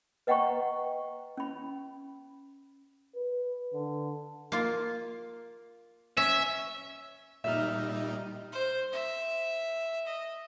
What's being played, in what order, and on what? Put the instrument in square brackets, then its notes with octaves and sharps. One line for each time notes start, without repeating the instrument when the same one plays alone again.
[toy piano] B4 D#5 F#5 G5 A#5 C#6
C#4 B5
[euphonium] B4
D3
[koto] A#3 F4
[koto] C#4 [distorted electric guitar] E5
[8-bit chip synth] A#2 G3 D#4 [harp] E5 F6
[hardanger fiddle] C5
E5
D#5